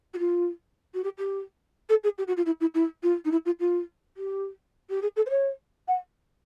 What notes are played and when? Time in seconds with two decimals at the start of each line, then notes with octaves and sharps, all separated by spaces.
0.14 F#4
0.19 F4
0.94 F#4
1.04 G4
1.18 G4
1.89 A4
2.03 G#4
2.18 G4
2.27 F#4
2.37 F4
2.46 E4
2.60 E4
2.74 E4
3.03 F4
3.25 D#4
3.31 E4
3.45 F4
3.60 F4
4.17 G4
4.90 G4
5.02 G#4
5.16 A4
5.26 C5
5.30 C#5
5.88 F#5